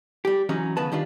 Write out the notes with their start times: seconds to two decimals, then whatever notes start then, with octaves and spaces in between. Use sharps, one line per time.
0.25 G3 G4
0.49 E3 F#3 C#4 D#4
0.77 C#2 D#3 B3 B4 A5
0.92 D#3 G3 D4 F4